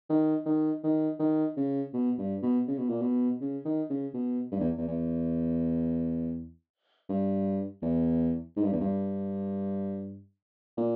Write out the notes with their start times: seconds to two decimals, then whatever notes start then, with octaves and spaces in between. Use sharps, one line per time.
0.10 D#3
0.46 D#3
0.83 D#3
1.19 D#3
1.57 C#3
1.93 B2
2.18 G2
2.42 B2
2.68 C#3
2.78 B2
2.89 A#2
3.01 B2
3.41 C#3
3.65 D#3
3.90 C#3
4.14 B2
4.52 G2
4.60 E2
4.78 E2
4.88 E2
7.09 G2
7.82 E2
8.56 G#2
8.64 G2
8.72 E2
8.80 G2
10.77 A#2